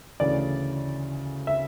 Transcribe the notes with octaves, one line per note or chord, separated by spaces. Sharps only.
D2 C#3 E3 D5
E5